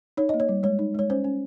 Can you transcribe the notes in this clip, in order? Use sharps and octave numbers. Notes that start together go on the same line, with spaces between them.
D#4 C#5
A#3 D#5
C#5
G3
G#3 C#5
D#4
G#3 C#5
C#4 C5
C#4